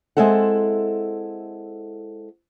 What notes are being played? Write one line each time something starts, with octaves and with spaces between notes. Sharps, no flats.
G#3 C4 E4 A4 F#5